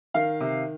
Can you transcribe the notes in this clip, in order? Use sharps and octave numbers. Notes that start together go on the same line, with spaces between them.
D#3 F5
C3